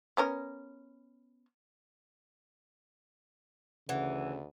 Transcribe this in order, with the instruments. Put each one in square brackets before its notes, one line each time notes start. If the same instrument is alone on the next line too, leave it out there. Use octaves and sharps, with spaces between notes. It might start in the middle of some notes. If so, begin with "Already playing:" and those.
[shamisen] B3 C#4 A#4
[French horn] D2 [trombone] C#3 [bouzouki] E3 [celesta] F#5